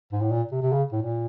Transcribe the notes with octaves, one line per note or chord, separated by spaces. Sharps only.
G#2
A2
A#2
C3
C3
C#3
A2
A#2